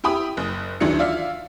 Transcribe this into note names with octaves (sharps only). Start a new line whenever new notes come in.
E4 G4 G5 B5 D#6
F#1
D2 D#3 E3 F#3 D4 C#7
F4 D5 E5 F5